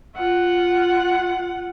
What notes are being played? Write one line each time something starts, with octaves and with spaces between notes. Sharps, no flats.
F4 F#5